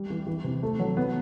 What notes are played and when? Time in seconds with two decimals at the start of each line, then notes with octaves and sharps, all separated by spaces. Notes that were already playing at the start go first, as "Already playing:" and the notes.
Already playing: G3
0.10 E3
0.27 E3
0.44 C3
0.63 A3
0.79 F#3
0.97 B3